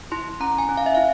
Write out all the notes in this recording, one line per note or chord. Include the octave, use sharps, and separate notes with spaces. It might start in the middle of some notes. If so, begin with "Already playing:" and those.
E4 C6
C#4 A#5
G#5
C#4
F5
E5
E4 F5